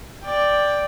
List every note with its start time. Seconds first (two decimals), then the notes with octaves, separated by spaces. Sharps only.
0.23 D5 G5